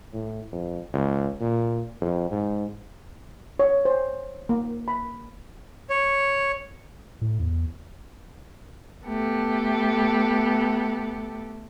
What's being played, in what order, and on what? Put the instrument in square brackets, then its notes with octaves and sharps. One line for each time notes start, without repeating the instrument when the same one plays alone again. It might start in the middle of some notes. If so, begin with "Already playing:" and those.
[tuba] A2
F2
C#2
A#2
F2
G#2
[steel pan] C#5
C5
A#3
B5
[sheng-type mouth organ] C#5
[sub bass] A2
E2
[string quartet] A3 B3 G4 A4